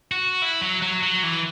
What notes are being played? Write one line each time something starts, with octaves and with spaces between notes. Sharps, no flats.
F#4
E4
F#3
F#3
F#3
E3